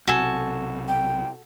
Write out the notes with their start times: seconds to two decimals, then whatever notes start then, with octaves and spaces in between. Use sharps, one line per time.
0.07 B1 C3 F#4 A4 G#5
0.88 G5